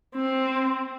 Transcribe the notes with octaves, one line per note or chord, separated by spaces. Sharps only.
C4